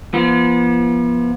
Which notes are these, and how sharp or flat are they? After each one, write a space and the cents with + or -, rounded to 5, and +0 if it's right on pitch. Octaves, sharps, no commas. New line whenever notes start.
F3 -35 B3 -40